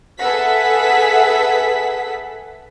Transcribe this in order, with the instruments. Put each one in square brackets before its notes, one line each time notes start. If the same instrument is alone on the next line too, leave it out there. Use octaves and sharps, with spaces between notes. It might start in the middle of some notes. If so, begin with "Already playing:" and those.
[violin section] G#4 A4 B4 E5 F#5 B6